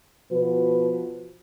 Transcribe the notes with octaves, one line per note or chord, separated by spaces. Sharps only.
B2 F3 F#4 B4